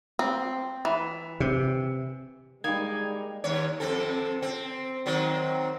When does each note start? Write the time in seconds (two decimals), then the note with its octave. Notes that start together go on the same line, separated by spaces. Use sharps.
0.19 C4
0.85 E3
1.40 C3
2.64 G3 G#3 A#3 D#4 G#5 G#6
3.44 D#2 C#5
3.80 F2 C4 A4
4.42 C4
5.06 D#3 F#3 C4